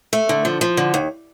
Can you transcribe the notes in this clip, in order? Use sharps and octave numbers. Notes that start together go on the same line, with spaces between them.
A3
D3
F3
F3
D3
D#2